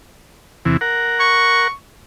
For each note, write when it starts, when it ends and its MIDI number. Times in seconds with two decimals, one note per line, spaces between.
0.65 0.77 40
0.65 0.77 48
0.65 0.77 52
0.81 1.68 70
0.81 1.68 78
1.20 1.73 85